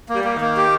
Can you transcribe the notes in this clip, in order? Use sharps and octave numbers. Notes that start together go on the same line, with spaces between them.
A#3
G3
A#3
D#3
A#3
G4